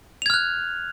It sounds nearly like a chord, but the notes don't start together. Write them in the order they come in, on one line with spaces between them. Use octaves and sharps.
F7 G#6 F6 F#6